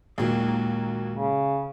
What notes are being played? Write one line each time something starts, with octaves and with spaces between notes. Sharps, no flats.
D#2 A#2 F#3 G#3 A#3
C#3